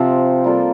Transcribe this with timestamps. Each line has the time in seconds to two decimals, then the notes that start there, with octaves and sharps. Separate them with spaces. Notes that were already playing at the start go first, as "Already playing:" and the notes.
Already playing: C3 F3 C4
0.44 G3 A#3 F4 A4